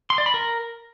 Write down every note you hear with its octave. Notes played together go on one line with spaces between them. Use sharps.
C6
D5
B5
A#4